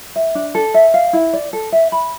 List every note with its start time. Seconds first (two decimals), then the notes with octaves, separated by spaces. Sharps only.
0.16 E5
0.35 D4
0.55 A4
0.74 E5
0.94 F5
1.13 E4
1.33 D5
1.53 A4
1.72 E5
1.92 B5